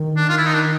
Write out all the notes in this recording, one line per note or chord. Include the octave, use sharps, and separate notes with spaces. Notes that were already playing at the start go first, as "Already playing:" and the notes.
Already playing: D#3
D4
F4
E4
D#4
D4